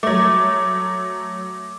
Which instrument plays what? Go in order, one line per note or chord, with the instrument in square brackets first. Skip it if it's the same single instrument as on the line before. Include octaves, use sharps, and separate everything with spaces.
[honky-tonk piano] F#3 A3 [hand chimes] D6